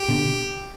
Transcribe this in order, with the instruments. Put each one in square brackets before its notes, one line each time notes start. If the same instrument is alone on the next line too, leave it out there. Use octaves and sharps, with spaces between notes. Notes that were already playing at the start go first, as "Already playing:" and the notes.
Already playing: [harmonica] G4
[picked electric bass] B2 D3